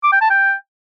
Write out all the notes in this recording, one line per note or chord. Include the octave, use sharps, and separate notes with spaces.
D6
G5
A5
G5